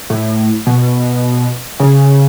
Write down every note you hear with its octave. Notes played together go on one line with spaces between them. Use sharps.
A2
B2
C#3